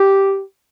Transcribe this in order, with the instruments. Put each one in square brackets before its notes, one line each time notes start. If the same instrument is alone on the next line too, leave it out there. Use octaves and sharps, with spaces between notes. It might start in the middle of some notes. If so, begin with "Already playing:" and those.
Already playing: [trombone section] G4